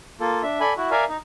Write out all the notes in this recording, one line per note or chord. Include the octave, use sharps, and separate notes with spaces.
A#3 F4 A4
D4 E5
A4 D5 G#5 B5
E4 F#4
A#4 D5 E5 F5 G#5
D#4